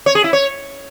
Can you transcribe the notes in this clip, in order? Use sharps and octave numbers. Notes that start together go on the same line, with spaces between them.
C#5
G#4
E4
C#5